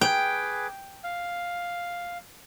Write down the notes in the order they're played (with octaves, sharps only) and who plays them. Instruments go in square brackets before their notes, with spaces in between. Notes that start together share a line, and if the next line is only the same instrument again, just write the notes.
[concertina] G#4 B4 D6 [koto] G5
[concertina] F5